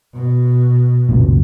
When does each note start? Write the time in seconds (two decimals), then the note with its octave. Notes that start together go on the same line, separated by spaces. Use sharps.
0.14 B2
1.09 C#2 F#2 A#2